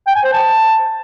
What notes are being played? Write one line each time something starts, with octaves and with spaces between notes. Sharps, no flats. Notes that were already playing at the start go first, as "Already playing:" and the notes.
G5
G#5
C5
A5